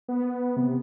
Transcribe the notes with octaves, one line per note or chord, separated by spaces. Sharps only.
B3
C3